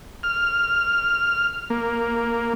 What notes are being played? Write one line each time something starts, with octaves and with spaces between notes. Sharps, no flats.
F6
A#3